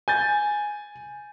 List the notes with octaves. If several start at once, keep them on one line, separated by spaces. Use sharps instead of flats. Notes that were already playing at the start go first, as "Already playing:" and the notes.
G#5 G6 A6